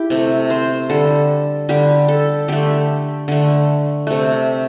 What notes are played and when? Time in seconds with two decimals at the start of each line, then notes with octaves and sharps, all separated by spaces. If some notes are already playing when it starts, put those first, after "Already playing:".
Already playing: E4 G4
0.10 C3 A3
0.50 C5
0.90 D3 G3 A4
1.69 D3 G3 G4
2.08 A4
2.48 D3 A3 G4
3.28 D3 A3
4.07 C3 A3